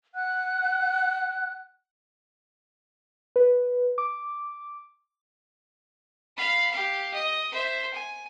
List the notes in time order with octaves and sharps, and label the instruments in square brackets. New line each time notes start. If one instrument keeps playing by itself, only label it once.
[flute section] F#5 F#6
[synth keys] B4
D6
[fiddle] F5 B5
G4 F5
D#5
C5 E5
G#5